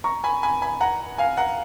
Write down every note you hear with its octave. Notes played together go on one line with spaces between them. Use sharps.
A#5 C#6
G#5 B5
G#5 B5
G#5 B5
F#5 A#5
F5 G#5
F#5 A#5